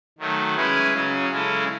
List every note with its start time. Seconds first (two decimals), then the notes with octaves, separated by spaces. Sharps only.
0.19 D#3 F#3 A3
0.56 G#3 C#4 E4 G#4 B4
0.93 C#3 F#3 C#4
1.30 C#3 G#3 C#4 E4 A4